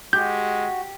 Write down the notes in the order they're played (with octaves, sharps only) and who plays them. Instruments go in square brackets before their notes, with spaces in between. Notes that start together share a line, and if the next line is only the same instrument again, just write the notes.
[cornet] G#3 [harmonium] F#4 [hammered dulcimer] G4 [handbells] G6